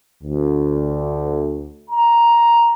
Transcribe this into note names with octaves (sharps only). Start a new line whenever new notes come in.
D2
A#5